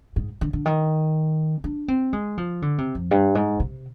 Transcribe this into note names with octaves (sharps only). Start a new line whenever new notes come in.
G#2
D3
D3
D#3
D4
C4
G#3
F3
D3
C3
F2
G2
G#2
C3